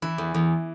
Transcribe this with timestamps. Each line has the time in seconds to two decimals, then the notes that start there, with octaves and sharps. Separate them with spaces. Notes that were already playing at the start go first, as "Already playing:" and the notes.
0.02 E3 E4
0.18 E2
0.34 E2